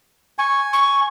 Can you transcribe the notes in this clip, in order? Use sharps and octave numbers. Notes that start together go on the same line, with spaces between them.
G#5 C#6
C#6